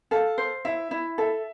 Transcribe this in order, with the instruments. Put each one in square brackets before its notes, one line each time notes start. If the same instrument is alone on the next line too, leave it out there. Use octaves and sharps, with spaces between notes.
[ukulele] A4 [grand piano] F5
[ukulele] C5
[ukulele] E4 [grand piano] E5
[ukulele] E4
[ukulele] A4 [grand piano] E5